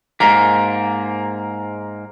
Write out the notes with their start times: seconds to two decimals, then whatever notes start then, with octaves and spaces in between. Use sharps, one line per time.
0.20 G#2 A#3 A#5